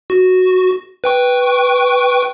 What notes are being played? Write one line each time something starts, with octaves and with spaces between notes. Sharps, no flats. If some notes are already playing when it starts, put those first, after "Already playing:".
F#4
B4 G5 C#6